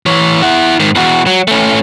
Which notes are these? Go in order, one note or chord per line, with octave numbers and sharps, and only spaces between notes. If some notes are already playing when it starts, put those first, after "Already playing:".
E3 C#5
E4 F#5
G#2 D#3
E2 F#4
F#3
A3 C#4